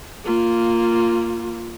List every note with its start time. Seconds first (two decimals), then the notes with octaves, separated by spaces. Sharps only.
0.25 A#3 F4